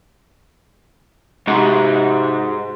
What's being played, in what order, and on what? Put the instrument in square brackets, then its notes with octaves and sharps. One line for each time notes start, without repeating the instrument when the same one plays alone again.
[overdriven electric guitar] G#2 [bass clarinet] C3 [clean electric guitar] D#4 F#4